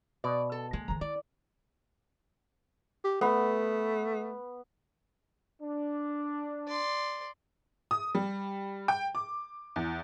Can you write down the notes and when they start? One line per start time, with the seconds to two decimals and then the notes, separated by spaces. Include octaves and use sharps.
0.24 B2 D5
0.52 A4
0.73 D#3 G#3 A#3
0.88 D#3 F3 A#5
1.01 E4 D5
3.04 G4
3.21 A3 B3
5.61 D4
6.68 D5 C6
7.91 D#6
8.15 G3
8.88 G5
9.15 D6
9.76 E2